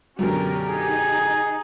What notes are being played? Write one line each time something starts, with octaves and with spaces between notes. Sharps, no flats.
F#2 B2 D3 C#4 G4 A#4
D#4 G#4